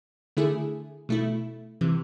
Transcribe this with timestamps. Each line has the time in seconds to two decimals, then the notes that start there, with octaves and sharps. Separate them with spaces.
0.37 D3 A3 E4 G#4
1.09 B2 A3 E4
1.81 C3 E3